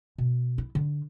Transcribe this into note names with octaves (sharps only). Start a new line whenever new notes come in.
B2
E4
D3